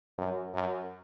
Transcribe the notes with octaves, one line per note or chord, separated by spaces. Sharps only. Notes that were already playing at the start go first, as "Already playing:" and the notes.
F#2
F#2